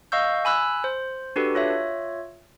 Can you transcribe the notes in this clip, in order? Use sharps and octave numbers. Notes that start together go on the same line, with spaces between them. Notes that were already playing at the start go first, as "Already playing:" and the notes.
D#5 F5 C#6 E6 G6
G#5 B5 E6 F#6
C5
D4 F#4 G4 A4 B4
F4 C#5 E5